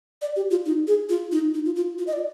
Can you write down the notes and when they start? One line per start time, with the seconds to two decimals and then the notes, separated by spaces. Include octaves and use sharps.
0.22 D5
0.36 G4
0.51 F4
0.66 D#4
0.87 G#4
1.09 F4
1.32 D#4
1.54 D#4
1.65 F4
1.76 F4
1.98 F4
2.07 D#5
2.13 D5